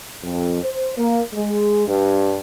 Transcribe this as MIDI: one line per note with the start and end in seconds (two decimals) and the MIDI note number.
0.23 0.62 41
0.63 0.96 72
0.97 1.21 58
1.33 1.87 56
1.87 2.38 43